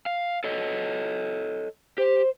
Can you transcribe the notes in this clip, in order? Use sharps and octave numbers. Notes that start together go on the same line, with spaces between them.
F5
A4 C#5 D#5
G4 C5